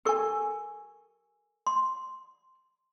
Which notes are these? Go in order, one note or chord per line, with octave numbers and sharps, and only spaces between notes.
G4 A4 A#4 G#5 C#6
C6